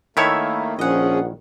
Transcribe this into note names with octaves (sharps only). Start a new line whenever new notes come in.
D#3 A3 A#3 E4 C#5 E5 A5 B5
A#1 F3 C#4 G#4 D#5 F#5